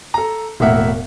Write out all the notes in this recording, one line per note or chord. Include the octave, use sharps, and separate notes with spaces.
A4 A#5
E1 A2 A#3 A#4 E5 F#5